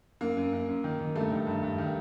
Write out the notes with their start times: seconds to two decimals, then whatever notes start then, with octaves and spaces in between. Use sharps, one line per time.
0.21 F#2 A#3
0.37 F#2
0.53 F#2
0.68 F#2
0.84 D#3
0.99 D#3
1.15 G2 A3
1.31 D#3
1.47 G2
1.63 G2
1.78 D#3